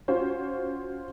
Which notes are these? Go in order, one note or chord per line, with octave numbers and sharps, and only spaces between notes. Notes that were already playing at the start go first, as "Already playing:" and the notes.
C#4 F4 F#4 C5